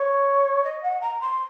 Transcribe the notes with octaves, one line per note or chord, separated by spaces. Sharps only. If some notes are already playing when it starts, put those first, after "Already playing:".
Already playing: C#5
D#5
F#5
A#5
C6